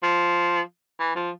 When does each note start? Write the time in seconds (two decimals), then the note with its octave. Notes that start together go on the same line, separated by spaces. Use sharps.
0.03 F3
1.00 E3
1.16 F3